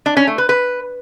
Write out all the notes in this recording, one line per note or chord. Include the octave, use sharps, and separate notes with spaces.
D4
C#4
A3
B4
B4